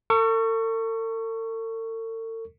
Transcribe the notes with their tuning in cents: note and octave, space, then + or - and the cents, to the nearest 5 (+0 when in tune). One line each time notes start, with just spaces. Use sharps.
A4 +45 C#6 +5